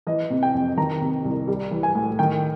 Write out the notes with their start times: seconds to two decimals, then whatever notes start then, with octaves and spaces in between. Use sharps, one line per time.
0.07 E3 D#5
0.30 C3
0.43 G5
0.54 F2
0.77 D#3 A#5
1.01 C3
1.25 C2
1.48 G3
1.71 E3
1.83 G#5
1.95 A2
2.19 D#3 G5